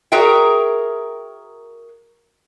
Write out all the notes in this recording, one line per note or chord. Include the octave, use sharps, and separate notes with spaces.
F#4 G#4 A#4 E5 G5